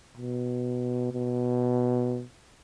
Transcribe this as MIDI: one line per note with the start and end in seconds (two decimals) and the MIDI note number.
0.17 1.08 47
1.12 2.23 47